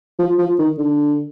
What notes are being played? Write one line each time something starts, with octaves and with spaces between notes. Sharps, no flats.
F3
F3
D#3
D3